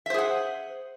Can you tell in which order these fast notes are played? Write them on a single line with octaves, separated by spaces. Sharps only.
E5 C5 G#4 F#5